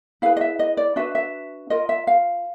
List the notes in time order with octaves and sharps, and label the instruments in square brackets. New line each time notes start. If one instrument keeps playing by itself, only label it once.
[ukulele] E4 G#4 B4 F5
D#5
E5
D#5
D5
D4 F#4 B4 E5
E5
F4 A#4 D#5
E5
F5